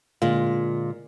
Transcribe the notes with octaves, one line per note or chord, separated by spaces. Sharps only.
A#2 D3 G#3 F4 F5